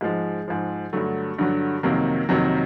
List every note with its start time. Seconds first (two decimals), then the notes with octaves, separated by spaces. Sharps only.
0.01 G#2 F3 G#3
0.48 G#2 F3
0.93 G2 D3 F#3 A3
1.39 G2 D3 F#3
1.83 F2 C3 D#3 F#3 A#3
2.29 F2 C3 D#3 F#3